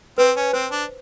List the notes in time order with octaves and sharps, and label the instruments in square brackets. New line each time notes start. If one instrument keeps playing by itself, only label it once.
[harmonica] C4 [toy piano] B4
[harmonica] C#4
[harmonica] C4 [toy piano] C5
[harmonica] D4